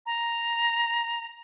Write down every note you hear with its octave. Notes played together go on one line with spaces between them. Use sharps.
A#5